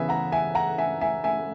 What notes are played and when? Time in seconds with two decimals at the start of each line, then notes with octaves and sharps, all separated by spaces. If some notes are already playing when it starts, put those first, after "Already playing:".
Already playing: C#3 E3 B3 E5 G#5
0.09 F#5 A#5
0.32 E5 G#5
0.55 F#5 A#5
0.78 E5 G#5
1.01 E5 G#5
1.24 E5 G#5